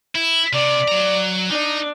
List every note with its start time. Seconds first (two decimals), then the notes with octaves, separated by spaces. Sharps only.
0.15 E4
0.53 C3 D5
0.88 F#3 A#5
1.50 D4 D#4